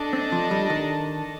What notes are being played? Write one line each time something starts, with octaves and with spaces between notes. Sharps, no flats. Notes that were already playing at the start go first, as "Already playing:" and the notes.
Already playing: D4 A4 D#5 A5
C4
F3
G3
D#3